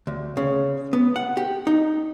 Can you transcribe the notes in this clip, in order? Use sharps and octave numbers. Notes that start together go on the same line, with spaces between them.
D2
C#3
B3
F#5
G4
D#4